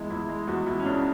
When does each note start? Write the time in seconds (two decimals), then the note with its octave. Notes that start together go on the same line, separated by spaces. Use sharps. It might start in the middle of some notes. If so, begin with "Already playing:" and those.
Already playing: E2 G#3 E4
0.10 E2 E4
0.29 G#3
0.47 E2 F#4
0.66 E2 E4
0.79 C#4
0.85 C#3 D4